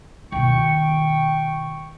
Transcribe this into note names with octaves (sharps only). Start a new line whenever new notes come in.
B2 D#3 G5 C#6